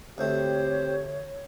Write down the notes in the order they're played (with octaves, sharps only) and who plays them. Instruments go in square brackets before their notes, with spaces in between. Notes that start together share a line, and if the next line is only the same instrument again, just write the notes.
[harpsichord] D2 A3 [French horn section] C4 G4 [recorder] C5 [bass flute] C#5